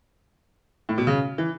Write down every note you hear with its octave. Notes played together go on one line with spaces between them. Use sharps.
A2
B2
C#3
E3